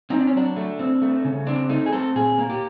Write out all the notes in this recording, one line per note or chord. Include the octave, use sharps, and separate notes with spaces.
C4 D#4
D4
C#4
F#3 D4
A3
C4
A3
C#3
C4 D4
A3 D#4
G#4
C4 A4
A#2 G#4
A#3
G4